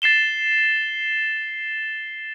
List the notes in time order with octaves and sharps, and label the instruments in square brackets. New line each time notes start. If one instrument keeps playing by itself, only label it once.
[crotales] A6 C7 E7 G7